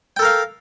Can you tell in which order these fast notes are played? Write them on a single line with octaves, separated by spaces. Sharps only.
G5 A4 A#4 F5